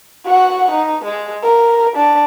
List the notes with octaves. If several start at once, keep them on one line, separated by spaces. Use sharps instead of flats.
F#4 F#5
D#4
G#3
A#4
D4